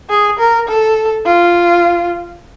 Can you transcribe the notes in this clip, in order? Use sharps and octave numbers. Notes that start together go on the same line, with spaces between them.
G#4
A#4
A4
F4